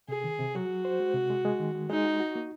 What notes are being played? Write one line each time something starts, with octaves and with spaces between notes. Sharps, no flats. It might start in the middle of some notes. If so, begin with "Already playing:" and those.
C3 G#4
D#3
C3
F#3 F#4
F#3
C5
G#3
C3
G#3
G#3
D#3
G#3
G#3 D#4
F#4
F#4
A#3